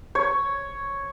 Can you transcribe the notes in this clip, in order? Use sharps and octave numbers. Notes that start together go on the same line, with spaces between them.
C#5